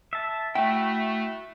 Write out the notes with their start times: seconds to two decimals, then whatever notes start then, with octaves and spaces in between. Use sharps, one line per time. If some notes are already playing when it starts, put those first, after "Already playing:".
0.13 E5 A5
0.55 A3 E4 F#4 G5